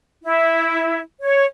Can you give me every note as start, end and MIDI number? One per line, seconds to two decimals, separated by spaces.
0.23 1.00 64
1.21 1.45 73